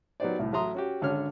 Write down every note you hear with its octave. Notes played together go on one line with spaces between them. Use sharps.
F#3 B3 D#4 G4 C5 D5
C2 A2
A1 F#3 E5 A#5 C6 D#6
C#4 F#4 G4
G#1 D3 C#4 C#5 F6